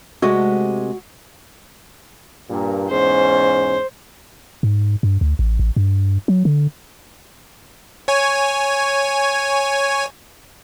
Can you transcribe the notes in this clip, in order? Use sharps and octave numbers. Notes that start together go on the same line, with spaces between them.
C3 G#3 A3 F#4
G2 A#2
E2 G#2 C#4 C5
G#2
G2
D2
A1
A1
G2
F#3
D3
C#5 G#5